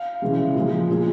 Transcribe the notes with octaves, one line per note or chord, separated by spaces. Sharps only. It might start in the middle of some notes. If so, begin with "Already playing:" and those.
Already playing: F5
C#3 E3 G#3
A#2 F3 G#3
A#2 G#3